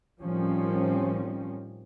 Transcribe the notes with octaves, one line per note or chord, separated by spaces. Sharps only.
A2 D#3 F3 G3 C4 C#4